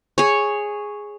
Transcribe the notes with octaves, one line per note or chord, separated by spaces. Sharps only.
G#4 C#5